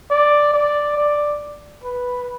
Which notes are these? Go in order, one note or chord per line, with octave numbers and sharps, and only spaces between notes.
D5
D5
D5
B4